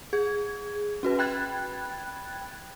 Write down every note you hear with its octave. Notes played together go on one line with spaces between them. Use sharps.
G#4 G#6
C#4 F#4 B4
G5 B5 F#6 G#6 A6